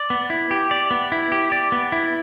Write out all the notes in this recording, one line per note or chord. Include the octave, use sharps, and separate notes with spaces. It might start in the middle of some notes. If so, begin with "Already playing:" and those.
Already playing: D5
B3
E4
G4
D5
B3
E4
G4
D5
B3
E4